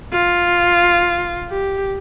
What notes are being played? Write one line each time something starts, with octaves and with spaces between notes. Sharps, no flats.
F4
G4